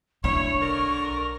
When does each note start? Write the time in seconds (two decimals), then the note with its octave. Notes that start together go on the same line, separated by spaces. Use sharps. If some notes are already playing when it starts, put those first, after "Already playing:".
0.24 B1 D4 E4 C#5 C#6
0.60 D3 A#4